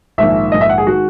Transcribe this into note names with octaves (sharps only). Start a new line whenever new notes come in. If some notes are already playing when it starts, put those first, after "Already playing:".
A#1 G#2 D#3 E5
A#1 G#2 D#3 D#5
E5
F#5
G#4
D#3 G#3 F#4